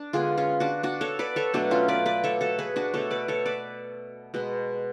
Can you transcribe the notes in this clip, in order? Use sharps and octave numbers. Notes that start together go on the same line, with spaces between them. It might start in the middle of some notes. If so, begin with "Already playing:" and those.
Already playing: D4
D3 G#3 B3 F4 G#4
C#4 F4
D4 F#4
D4 F#4
A4 C#5
B4 D5
A4 C#5
B2 F#3 A3 D4
C#4 F4
B4 D5
B4 D5
A4 C#5
F#4 A4
G#4 B4
D4 F#4
B2 A3 A4 C#5
B4 D5
A4 C#5
B4 D5
B2 G#3 B3